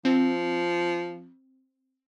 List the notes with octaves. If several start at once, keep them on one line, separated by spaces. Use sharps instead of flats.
F3 C4